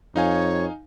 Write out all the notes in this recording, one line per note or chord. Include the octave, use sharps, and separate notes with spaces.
F2 D#4 C#5 F5 G#5